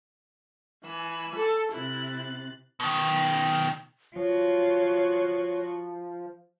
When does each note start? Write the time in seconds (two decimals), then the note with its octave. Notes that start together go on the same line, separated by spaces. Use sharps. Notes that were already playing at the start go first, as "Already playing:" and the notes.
0.84 E3 G#5 B5 E6
1.35 A4
1.72 C3 E4 F#6 A6
2.80 B2 D#3
4.16 F3 F4 F#4 C#5